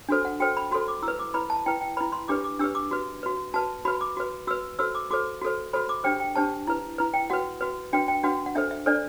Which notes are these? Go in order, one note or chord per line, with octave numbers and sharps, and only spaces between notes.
D4 F#4 A4 C5
F#5
F#4 A4 C5 G5
B5
F#4 A4 C5 C6
D6
E4 E6
B4
D6
E4 B4 B5
A5
E4 B4 G5
G5
E4 B4 B5
C6
D4 G4 B4 D6
D6
D4 G4 B4 E6
D6
F#4 B4
F#4 B4
F#4 B4 A5
F#4 B4 B5
D6
F#4 B4
F#4 B4 E6
F#4 A4 C5 E6
D6
F#4 A4 C5 D6
F#4 A4 C5
F#4 A4 C5 B5
D6
D4 G4 C5 G5
G5
D4 G4 C5 A5
E4 B4
E4 B4
G5
F#4 B4 F#5
F#4 B4
D4 F#4 B4 G5
G5
D4 F#4 B4 F#5
F#5
D4 A4 C5 E5
E5
D4 A4 C5 D5